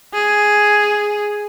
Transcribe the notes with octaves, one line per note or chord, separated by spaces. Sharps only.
G#4